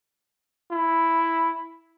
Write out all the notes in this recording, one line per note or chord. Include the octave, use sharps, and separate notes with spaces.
E4